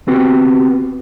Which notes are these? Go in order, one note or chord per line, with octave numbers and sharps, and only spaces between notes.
B3 C4 F#4 G4